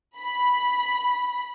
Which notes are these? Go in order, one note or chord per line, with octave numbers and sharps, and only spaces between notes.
B5